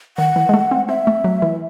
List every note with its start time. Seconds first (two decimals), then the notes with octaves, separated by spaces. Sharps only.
0.17 D#3 F#5
0.36 E3
0.49 G#3
0.54 A3
0.71 C4
0.89 C4 E5
1.07 A3
1.24 F#3
1.42 E3